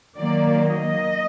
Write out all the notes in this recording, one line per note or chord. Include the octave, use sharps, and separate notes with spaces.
D#3 F#3 A#3 D5
D#5